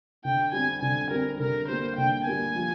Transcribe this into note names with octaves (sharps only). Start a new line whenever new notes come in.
D3 G5
G3 C4 G#5
D3 G#5
G3 C4 A#4
D3 A#4
G3 A#3 C5
D3 G5
G3 A#3 G#5
F3